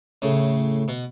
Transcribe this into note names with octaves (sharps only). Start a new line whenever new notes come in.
A2 C#3
B2